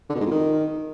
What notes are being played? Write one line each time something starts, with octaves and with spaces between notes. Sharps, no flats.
D3
B2
G#2
F2
D#3